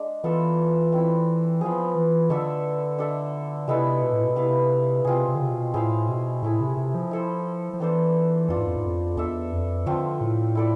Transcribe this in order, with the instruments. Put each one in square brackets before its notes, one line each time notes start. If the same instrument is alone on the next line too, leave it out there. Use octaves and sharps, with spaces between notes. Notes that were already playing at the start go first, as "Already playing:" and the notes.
Already playing: [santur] G#3 D4
[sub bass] E3 [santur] B3 F4 A4 E5
[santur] A3 C4 E4
[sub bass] F3 [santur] B3 F4 G#4
[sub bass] E3
[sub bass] D3 [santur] A3 D4 A4 E5
[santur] D4 A4 E5
[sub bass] C3 [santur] G#3 B3 E4 A4
[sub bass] B2
A2
B2
[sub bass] C3 [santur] B3 E4 B4 F5
[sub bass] C3 [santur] C4 F4 G#4
[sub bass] C3
D3
C3
B2
[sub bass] A2 [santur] E4 G#4 C5 F5
[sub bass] B2
[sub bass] A2 [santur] A3 E4 G#4
[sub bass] C3
C3
F3
[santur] E4 A4 C5
[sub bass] F3
[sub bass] E3 [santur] B3 D4 A4 C5
[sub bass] F2 [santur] D4 F4 A4
[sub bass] G#2
F2
G#2
F2
[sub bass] E2 [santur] D4 A4 E5
[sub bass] F2
[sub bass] D3 [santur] F3 A3 C4 F4
[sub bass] A2
[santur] E4 A4 D5